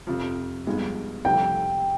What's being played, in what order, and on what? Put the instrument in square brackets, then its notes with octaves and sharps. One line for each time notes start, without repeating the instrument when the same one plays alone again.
[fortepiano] F2 C3 F3
G2 F3 G#3 B3
[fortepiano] F2 C3 G3 C4 [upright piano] G5